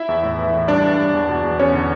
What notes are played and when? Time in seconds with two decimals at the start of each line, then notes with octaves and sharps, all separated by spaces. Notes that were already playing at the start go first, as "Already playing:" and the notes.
Already playing: E4 E5
0.09 E2
0.23 A2
0.38 E3
0.54 A2
0.68 G2 D4 D5
0.84 E3
0.99 G2
1.14 E2
1.29 B2
1.44 E2
1.59 E2 C#4 C#5
1.74 D3